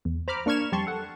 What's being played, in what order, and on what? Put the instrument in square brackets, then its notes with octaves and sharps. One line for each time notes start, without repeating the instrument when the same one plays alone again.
[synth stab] E2
C5 A#5 B5 D6 F6
A#3 D4 C#6 F6 G#6 E7
F2 G3 G4 A5 C6 C#6
A4 F#5